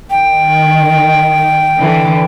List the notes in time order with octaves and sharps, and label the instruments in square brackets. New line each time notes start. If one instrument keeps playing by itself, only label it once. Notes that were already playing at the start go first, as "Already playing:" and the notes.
[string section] D#3 [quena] G5
[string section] D3 E3